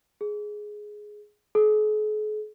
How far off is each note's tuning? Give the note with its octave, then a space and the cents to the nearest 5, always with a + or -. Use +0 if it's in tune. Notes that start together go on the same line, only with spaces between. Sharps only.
G#4 +10
G#4 +45